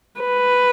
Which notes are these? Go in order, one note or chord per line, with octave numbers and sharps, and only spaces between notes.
B4